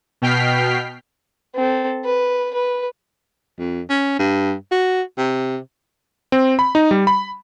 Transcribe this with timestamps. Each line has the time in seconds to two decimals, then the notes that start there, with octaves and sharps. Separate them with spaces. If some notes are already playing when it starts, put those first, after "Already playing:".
0.22 B2 G5 F6 B6 C7
1.55 C4 A4
2.05 B4
2.54 B4
3.59 F2
3.90 C#4
4.19 G2
4.71 F#4
5.18 C3
6.32 C4
6.59 B5
6.75 D#4
6.91 G3
7.07 B5